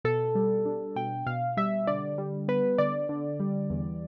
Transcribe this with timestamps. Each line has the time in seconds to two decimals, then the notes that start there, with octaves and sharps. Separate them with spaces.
0.05 B2 A4
0.35 G3
0.65 D4
0.96 B2 G5
1.26 B2 F5
1.57 G3 E5
1.87 D3 D5
2.18 G3
2.48 B3 B4
2.78 D3 D5
3.09 D3
3.40 G3
3.70 E2